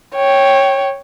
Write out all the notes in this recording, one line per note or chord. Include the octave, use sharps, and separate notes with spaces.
C#5 G5